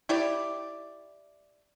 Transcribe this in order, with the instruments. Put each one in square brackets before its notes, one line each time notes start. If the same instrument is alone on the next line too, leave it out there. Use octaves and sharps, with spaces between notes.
[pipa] E4 G4 D5